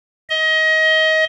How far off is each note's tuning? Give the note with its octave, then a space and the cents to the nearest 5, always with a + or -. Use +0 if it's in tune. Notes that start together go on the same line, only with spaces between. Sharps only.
D#5 +25